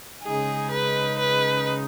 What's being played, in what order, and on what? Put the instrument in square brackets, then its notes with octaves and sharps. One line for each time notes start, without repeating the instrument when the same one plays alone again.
[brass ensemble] C#3 G#3 D#4 [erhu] G#4
[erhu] B4
B4